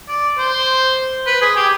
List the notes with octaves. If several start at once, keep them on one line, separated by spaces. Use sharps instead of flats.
D5
C5
B4
G#4
G4